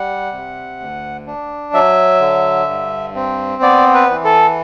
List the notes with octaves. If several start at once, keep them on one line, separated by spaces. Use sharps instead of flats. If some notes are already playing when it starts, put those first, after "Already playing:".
Already playing: G3 F#5
C3
D2
D4
F#3 E5
D3
G2
C4
B3 D5
B4
E3
A4